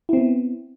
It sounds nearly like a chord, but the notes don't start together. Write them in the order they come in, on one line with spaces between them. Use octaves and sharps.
E4 C4 B3